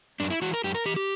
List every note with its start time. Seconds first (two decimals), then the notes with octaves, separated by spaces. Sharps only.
0.20 F#2 D4
0.30 E4
0.42 E3 F#4
0.54 A#4
0.64 F#2 G4
0.75 A#4
0.85 E3 G4
0.96 G4